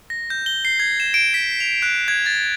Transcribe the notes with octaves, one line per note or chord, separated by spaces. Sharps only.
A#6
G6
G7
C7
G#6
E7
D7
B6
F7
F#6
G#6
A6